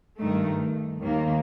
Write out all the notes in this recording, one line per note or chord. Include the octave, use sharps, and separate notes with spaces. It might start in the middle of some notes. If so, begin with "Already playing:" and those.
G2 D#3 A3
D#2 D#3 A#3